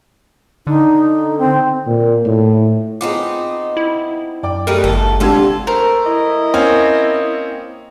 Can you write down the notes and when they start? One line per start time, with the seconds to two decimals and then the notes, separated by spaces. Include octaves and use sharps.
0.67 D3 D#4
1.38 C4
1.87 A#2
2.25 A2
3.01 B3 C4 D#4 F4 G#4 D6
3.77 E4
4.43 F#2 D5 G5 D6
4.67 G3 A3 D#4 G4 G#4 A#4 B4
4.84 G1 A4
5.20 C2 G#3 D4 F4 G4 A4 E6 G#6
5.67 A3 A#4 C5
6.06 E4 D#5
6.54 A#3 C4 C#4 F6